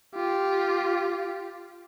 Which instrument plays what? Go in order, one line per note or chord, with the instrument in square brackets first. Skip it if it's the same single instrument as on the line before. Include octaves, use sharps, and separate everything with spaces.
[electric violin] F4 G4